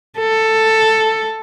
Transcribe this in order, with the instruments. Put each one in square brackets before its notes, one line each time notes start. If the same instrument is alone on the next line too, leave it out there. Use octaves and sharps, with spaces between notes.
[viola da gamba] A4